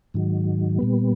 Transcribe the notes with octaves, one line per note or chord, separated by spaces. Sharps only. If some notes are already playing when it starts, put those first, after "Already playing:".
G#2 D#3 F#3
A#2 G3 B3